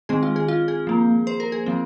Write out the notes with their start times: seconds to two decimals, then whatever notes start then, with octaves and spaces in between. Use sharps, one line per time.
0.09 D#3 G#3 C4 G#4
0.23 F4
0.36 G#4
0.48 F4
0.68 G#4
0.87 F3 A#3
1.27 C5
1.40 A#4
1.52 G#4
1.66 F3 C4